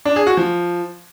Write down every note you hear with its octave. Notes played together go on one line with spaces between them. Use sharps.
D4
G#4
F#4
F3